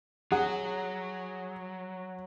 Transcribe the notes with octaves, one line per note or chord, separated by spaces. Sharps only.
F#3 G#4 F#5